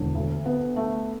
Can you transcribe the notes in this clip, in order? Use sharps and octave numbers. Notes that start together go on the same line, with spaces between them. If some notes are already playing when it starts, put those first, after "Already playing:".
Already playing: E1 D3
D2
B3
A3